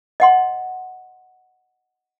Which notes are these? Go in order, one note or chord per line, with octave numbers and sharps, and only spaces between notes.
D#5 F#5 C6